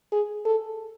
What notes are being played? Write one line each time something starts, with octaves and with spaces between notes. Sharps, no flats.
G#4
A4